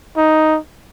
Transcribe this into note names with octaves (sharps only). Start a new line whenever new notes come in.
D#4